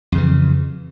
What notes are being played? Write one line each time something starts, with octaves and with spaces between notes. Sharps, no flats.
F2 C#3 E3